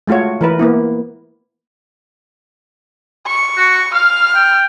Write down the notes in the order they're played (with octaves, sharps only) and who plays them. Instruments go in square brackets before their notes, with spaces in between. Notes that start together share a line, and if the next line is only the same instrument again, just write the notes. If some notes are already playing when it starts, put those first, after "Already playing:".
[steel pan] G#3 A3 F4 F#4 C#5
E3 A#4 B4
A#3 B3 E4
[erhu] C#6
[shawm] F#4
[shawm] F5 [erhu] F6
[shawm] G5